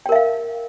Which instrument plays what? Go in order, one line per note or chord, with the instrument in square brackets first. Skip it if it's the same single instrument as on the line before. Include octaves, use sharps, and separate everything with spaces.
[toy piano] G5
A#4
E5
F5